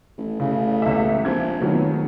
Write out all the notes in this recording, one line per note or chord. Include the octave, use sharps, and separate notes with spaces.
A1
A1 C#3
C#2 E5
A#1 C4 G#6
F1 D#3 F#3 B3